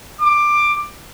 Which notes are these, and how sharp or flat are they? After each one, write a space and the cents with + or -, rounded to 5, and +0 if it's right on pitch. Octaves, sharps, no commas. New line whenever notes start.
D6 +15